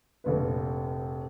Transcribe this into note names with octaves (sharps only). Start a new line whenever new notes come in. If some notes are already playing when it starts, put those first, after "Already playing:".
F1 A#1 B4